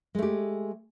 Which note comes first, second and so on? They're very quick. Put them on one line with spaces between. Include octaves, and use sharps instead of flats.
G#3 A3 G4